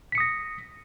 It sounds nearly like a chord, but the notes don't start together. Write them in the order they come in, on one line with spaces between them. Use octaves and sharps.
B6 C#7 D#6 A#6